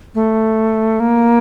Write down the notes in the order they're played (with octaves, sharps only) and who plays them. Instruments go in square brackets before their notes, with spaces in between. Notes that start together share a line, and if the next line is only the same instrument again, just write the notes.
[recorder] A3
A#3